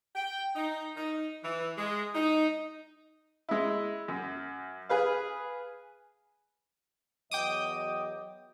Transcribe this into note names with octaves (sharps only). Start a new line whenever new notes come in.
G5
D#4
D#4
E3
G#3
D#4
G#3 E4
F#2
G#4 B4 F5
E2 F#3 D#5 G5 D6 D#6